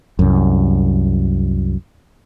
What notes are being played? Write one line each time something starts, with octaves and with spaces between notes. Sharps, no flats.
C2 F#2